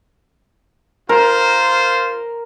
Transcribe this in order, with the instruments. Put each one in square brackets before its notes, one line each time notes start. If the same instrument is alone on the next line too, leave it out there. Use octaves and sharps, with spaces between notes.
[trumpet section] F4 C5 [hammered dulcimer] A#4